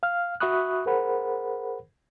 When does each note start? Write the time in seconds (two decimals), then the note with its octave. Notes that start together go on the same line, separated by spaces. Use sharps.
0.03 F5 F6
0.40 F#4 E5 B5 C#6 D#6 F#6
0.86 G#4 A#4 C5 F#5 B5